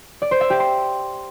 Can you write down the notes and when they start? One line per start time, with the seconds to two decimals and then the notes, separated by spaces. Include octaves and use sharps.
0.22 D5
0.31 C5
0.41 E5
0.50 G4
0.60 C6